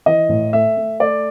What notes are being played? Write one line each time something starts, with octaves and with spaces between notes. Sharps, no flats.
E3 D#5
A2
A3 E5
A3
A3 D5